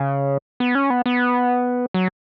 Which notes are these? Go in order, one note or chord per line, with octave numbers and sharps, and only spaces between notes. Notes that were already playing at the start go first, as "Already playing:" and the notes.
Already playing: C#3
B3
C#4
B3
B3
F#3